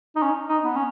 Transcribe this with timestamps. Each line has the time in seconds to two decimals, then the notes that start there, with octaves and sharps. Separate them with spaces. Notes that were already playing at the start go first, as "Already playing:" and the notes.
0.16 D#4
0.23 C#4
0.49 D#4
0.64 B3
0.76 C#4